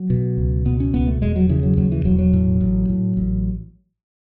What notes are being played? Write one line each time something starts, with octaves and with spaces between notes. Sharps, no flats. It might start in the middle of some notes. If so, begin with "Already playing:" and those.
Already playing: F#3
B2
C#2
B2 B3
C#4
C#2 B3
A3
E1 G#3
F#3
C#3 E3
F#3
D#2 F#3
E3
E1 F#3
F#3
A2
A1
A2
A1